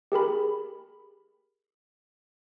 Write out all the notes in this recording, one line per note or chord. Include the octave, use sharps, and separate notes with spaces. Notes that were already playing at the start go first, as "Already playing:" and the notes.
G4 G#4 A#4 B5